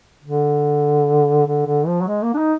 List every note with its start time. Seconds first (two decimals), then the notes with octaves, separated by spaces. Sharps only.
0.23 D3
1.46 D3
1.66 D3
1.87 F3
2.02 F#3
2.08 G#3
2.23 A#3
2.34 D4
2.38 D#4